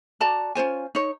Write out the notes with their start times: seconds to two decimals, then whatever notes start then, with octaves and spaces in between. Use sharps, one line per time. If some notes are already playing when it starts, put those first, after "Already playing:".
0.20 F#4 D5 A5 A#5
0.55 C#4 F4 C5 G#5
0.95 D#4 C#5